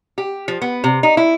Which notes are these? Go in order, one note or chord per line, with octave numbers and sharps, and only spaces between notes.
G4
F3
B3
C3
D#4
E4